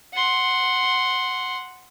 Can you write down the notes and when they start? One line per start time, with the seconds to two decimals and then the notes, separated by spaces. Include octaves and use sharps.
0.14 F#5 C6